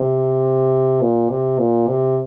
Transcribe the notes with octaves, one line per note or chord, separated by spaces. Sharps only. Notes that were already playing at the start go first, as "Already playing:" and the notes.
Already playing: C3
A#2
C3
A#2
C3